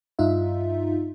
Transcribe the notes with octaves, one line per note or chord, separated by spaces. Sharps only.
G2 D#4 F4 E5